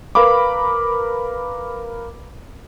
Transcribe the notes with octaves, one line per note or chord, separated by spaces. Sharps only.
A#4 B4 F5 B5 D6